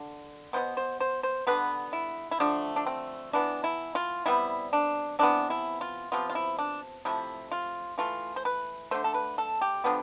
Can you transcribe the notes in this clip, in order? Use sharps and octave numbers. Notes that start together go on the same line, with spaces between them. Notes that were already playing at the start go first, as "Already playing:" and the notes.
Already playing: D3
B2 G3 B3 C5
C5
C5
C5
D3 G3 B3 B4
E4
E4
D3 F3 A3 D4
D4
C4
E3 B3 D4
E4
F4
C3 G3 B3 E4
D4
C3 E3 B3 D4
E4
F4
C3 F3 B3 F4
F4
E4
D4
C3 F3 A3 E4
F4
E3 A3 F4
C5
B4
D3 A3 C5
A4
B4
A4
G4
D3 F3 B3